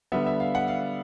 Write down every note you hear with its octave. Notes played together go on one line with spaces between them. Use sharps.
D3 G3 B3 E5
E5
F5
F#5
F5